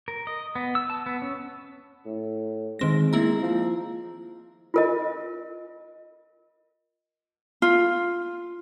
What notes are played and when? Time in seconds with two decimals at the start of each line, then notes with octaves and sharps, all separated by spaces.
0.08 A#4
0.27 D#5
0.55 B3
0.75 E6
0.90 A5
1.06 B3
1.22 C#4
2.05 A2
2.79 D#3 G#3 C4 A#6
3.13 A#3 E4 A#5
3.42 F3
4.74 F4 A#4 D#5
7.62 F4